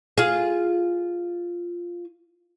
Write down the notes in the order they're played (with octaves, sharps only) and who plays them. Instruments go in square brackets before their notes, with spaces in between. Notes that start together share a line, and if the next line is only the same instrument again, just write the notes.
[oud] F4 G#4